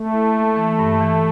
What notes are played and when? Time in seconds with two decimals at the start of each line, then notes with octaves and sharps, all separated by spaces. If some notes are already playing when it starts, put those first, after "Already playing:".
Already playing: A3
0.13 E4
0.34 A#3
0.56 E3
0.79 G2
1.01 E3